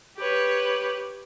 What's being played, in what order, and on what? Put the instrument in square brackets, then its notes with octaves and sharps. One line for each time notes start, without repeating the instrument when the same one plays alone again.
[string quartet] G4 B4 C#5